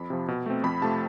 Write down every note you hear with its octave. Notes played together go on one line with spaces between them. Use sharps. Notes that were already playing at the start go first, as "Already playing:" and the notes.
Already playing: F2 B5
C3 F3
B2
A3 C4
F2 B5
C3 F3 A3 A5